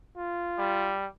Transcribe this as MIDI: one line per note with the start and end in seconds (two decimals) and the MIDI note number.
0.17 0.97 65
0.58 1.06 55